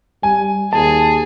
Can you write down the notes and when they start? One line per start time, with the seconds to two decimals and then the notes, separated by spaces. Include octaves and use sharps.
0.23 G3 G#5
0.73 D#2 G#4 A5